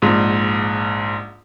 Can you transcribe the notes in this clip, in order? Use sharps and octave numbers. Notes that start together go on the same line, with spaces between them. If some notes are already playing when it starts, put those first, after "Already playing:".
A#1 G#2